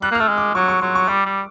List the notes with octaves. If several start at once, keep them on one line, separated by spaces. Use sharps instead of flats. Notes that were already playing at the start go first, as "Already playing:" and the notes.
G3 F#6
A#3
F6
A3 E6
G#3
D6
F#3 C#6
C#6
F#3 C6
C#6
G3 D6
G3